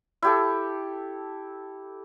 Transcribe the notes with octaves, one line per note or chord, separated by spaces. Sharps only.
E4 G4 A4